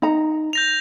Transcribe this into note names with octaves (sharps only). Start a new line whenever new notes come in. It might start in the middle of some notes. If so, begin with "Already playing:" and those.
D#4 A#5
G6 A#6 F7